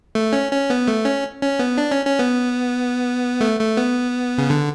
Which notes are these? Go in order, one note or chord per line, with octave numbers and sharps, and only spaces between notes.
A3
C#4
C#4
B3
A3
C#4
C#4
B3
D4
C#4
C#4
B3
A3
A3
B3
C#3
D3